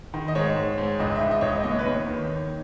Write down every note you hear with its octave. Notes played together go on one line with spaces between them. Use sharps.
D#3
D#5
G#2 C#5
G#2
G#2
C#2 D#5
E5
C#2
D#5
C#2 C#5
D#5
D#2 D#5
C#5
B4
D#2 C#5
D#3